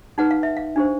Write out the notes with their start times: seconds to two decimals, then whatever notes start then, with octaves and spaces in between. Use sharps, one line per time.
0.18 D#4 G#4 B4 F#5
0.31 F5
0.43 E5
0.57 F5
0.76 D4 G4 C5